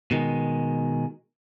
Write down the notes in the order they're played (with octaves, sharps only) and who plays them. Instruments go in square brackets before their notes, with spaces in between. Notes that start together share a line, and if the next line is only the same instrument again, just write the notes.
[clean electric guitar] B2 D#3 G#3